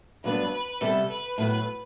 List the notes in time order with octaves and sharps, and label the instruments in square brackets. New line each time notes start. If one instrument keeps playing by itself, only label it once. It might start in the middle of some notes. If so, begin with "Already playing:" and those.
[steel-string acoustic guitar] G2 F#3 B3 D4 [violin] B4
[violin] B4
[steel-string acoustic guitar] C3 G3 B3 [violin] A4
[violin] B4
[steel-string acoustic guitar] A2 F#3 B3 [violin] B4